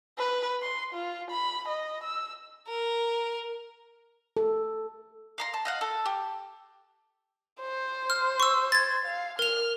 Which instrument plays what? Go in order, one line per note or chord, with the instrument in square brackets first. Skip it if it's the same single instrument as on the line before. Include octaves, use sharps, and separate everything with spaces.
[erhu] B4
C6
F4
B5
D#5
E6
[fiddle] A#4
[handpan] A4
[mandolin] F5 A#5 C6
A5
D#5 F5 F#5
A4
G4
[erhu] C5
[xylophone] F6
C#6 E6
G#6 A6
[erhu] F5
[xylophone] A#4 F7 [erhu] F6